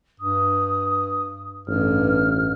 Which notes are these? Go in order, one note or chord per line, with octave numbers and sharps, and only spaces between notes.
G2 D#6
A1 G2 F6